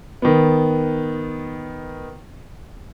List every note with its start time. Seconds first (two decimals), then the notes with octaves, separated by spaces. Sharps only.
0.22 D#3 B3